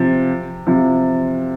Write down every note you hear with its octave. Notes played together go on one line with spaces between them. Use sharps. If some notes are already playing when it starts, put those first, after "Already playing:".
Already playing: C3 F3
C3 F3